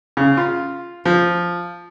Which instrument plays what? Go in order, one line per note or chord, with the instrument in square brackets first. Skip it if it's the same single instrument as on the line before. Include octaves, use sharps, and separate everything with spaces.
[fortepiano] C#3
F4
F3